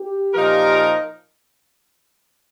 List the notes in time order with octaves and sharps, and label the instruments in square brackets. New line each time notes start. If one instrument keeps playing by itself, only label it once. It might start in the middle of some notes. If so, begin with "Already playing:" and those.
Already playing: [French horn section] G4
[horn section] A#2 F3 D#4 A#4